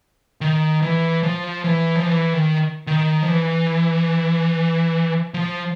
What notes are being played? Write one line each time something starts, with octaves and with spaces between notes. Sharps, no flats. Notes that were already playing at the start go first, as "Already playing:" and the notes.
D#3
E3
F3
E3
F3
E3
D#3
D#3
F3
E3
F3